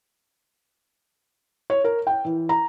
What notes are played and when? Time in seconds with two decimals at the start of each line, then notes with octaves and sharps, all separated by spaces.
1.70 C#5
1.84 A#4
2.07 G5
2.25 E3
2.49 A#5